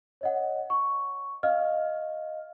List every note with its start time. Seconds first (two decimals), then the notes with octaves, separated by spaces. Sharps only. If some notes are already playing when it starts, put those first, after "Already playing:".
0.21 C#5 D#5 F#5
0.70 C#6
1.43 D#5 F5 F6